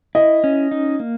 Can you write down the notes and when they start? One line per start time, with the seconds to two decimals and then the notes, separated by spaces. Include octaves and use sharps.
0.15 E4 D#5
0.44 C#4
0.71 D#4
1.00 A#3